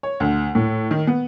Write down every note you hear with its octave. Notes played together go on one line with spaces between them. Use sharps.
C#5
D2
A2
D#3
B3